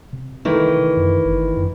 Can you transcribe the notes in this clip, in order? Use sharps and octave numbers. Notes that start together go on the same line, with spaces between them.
C3
D#3 E3 A3
F#2
G1
F#2